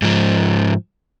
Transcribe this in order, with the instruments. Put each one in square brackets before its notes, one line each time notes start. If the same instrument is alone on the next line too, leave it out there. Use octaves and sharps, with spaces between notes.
[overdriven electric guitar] G#2 F3